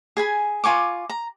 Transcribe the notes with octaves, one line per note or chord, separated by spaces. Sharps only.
G#4 G#5 B5
F4 G#5 C#6 D6
A#5